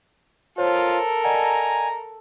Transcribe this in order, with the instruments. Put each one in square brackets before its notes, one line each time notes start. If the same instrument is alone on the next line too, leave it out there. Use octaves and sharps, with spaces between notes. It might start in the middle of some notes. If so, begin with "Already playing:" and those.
[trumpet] F4 [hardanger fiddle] A4 A#4 [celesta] C5 C#5
[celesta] D5 D#5 F#5 [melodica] G#5 [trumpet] A#5